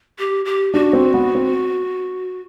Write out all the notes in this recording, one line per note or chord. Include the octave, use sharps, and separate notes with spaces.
G4
G4
D4 F#4
C4
B3
C4